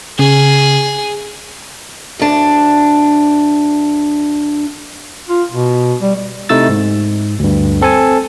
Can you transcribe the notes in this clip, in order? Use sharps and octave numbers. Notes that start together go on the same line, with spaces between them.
C#3 G#4
D2 D4
F4
B2
G3
C3 A3 D#4 E4 E6 A6
G#2
D2 G2
C4 A4 C5 G#5 A5